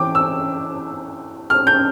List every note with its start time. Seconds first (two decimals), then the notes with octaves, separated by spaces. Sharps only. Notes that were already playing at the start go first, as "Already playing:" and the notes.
Already playing: E3 G5 D6
0.15 E6
1.50 F6
1.67 G6